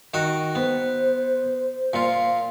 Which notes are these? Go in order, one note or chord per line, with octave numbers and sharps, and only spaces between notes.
D#3 F#4 D#5
B3 C5
A#2 F4